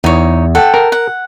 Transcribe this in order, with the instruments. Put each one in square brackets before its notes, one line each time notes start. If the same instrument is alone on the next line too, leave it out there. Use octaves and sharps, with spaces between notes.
[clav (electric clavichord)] E2 [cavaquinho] D#4 C#5
[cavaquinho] A4 F#5 G5
[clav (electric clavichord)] A#4
[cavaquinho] F#5